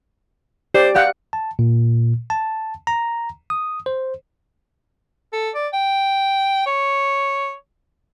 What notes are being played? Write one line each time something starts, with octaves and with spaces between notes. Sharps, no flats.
G4 C5 D5
G4 D5 F5 F#5
A5
A#2
A5
A#5
D#6
C5
A4
D5
G5
C#5